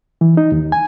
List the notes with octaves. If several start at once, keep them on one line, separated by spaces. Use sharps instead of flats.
E3
D#4
D#2
G#5